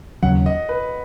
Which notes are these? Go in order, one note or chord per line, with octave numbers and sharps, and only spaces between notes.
D#2 C#3 F#3 C#4 F#5
D#5
B4